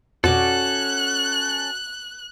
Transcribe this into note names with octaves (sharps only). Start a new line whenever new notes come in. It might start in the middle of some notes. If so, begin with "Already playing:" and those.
F2 B2 C#4 F#4 A4 D5 F#6